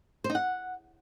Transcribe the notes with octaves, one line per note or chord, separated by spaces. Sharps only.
C5
D#4
F#5